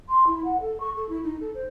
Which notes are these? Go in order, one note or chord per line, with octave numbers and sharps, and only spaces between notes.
C6
E4
F#5
A4
C#6
A4
E4
D#4
A4
C5